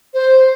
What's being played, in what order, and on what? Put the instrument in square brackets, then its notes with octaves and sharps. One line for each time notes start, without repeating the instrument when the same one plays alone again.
[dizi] C5